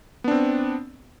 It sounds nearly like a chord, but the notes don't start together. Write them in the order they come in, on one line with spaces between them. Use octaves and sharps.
B3 D4 C4